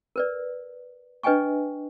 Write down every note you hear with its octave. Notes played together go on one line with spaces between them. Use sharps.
A#4 B4 D5
D4 B4 D#5 G5 G#5 C#6